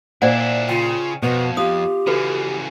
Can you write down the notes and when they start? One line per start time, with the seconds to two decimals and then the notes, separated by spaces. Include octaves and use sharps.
0.22 A#2 D4 E4 C5 D5 F#5
0.69 C#3 F4 G5
1.22 F2 B2 B4
1.57 F4 G4 D#6
2.07 C#3 E3 F#4 A4 B4